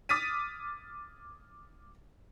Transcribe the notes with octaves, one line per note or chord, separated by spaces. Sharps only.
D6 D#6 F6 A6 B6 D#7